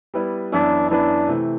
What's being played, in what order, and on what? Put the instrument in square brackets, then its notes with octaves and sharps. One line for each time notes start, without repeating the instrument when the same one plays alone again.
[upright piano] G3 B3 E4 B4 D5
[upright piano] F#2 E3 B3 E4 B4 [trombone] D4
[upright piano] F#2 E3 B3 E4 B4 [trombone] D4
[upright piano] C3 E3 A3